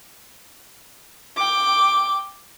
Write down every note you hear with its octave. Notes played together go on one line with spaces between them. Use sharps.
G5 D6